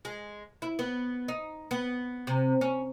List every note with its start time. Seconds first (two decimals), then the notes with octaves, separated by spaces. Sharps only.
0.05 G#3
0.62 E4
0.79 B3
1.28 D#4
1.71 B3
2.27 C3
2.61 C#4